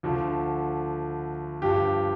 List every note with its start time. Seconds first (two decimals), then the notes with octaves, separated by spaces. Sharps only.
0.03 D2 D3 F3
1.62 G2 F3 G4